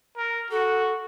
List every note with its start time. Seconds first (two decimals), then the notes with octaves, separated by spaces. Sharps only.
0.17 A#4
0.51 F#4 A4